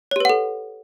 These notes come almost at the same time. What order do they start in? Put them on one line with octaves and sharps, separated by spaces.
C#5 G4 B4 F#5 A4